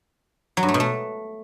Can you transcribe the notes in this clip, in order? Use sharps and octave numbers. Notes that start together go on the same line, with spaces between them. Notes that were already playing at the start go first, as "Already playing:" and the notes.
F#3
G2
A3
B2
A3